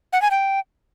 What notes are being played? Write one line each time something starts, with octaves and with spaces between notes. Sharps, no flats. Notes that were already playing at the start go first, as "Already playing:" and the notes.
F#5
G#5
G5